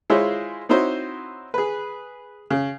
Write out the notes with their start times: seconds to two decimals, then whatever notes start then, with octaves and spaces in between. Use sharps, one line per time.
0.10 G#3 E4 F4 G#4 C5 C#5
0.69 C4 D#4 E4 F#4 C5 C#5
1.54 G#4 B4
2.50 C#3